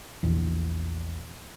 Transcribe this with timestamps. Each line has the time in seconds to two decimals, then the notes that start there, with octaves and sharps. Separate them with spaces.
0.23 A#1 E2